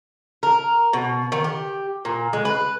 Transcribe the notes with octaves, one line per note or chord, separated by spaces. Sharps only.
A#4
B2
D#3
G4
A#2
G#3
B4